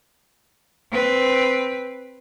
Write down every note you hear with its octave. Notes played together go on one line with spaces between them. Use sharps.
C4 B4